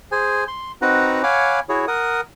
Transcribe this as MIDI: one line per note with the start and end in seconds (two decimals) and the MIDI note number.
0.12 0.44 68
0.12 0.44 72
0.12 0.44 80
0.48 0.72 84
0.82 1.22 60
0.82 1.22 63
0.82 1.22 66
0.82 1.22 71
0.82 1.22 78
0.82 1.22 82
1.23 1.60 73
1.23 1.60 77
1.23 1.60 78
1.23 1.60 80
1.23 1.60 83
1.23 1.60 86
1.69 1.85 64
1.69 1.85 66
1.69 1.85 68
1.69 1.85 73
1.88 2.21 70
1.88 2.21 78
1.88 2.21 87